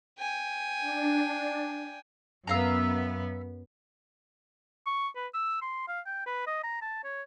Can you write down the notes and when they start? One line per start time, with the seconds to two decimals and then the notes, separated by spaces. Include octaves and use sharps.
0.19 G5 G#5
0.81 D4
2.47 F#2 B3 E5 F5 A#5
4.87 C#6
5.16 B4
5.34 E6
5.62 C6
5.88 F5
6.06 G5
6.26 B4
6.47 D#5
6.64 A#5
6.82 A5
7.04 C#5